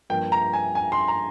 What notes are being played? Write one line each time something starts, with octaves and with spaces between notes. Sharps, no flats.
G2 F3 A#3 G5
A#5
G#5
G#5
C6
A#5